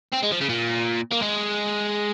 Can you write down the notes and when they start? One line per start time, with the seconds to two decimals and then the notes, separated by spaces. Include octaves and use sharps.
0.12 C4
0.23 G#3
0.32 F3
0.41 C#3
0.49 A#2
1.12 A#3
1.23 G#3